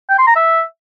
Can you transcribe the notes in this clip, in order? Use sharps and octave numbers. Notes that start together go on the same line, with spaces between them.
G5
C6
A#5
E5